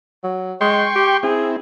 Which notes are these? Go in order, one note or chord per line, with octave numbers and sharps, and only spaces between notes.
F#3
G#3 G5 C6 C#6
G4
C4 E4 G#4